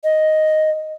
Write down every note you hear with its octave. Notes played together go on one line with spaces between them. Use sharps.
D#5